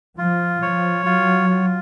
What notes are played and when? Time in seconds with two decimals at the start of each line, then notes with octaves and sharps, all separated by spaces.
0.18 F3 F4
0.62 F3 C#5
1.05 F#3 F4
1.50 F4